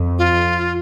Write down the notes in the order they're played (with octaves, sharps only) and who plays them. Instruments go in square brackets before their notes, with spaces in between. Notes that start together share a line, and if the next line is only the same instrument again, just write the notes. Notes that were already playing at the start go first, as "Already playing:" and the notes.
Already playing: [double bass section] F2
[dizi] F4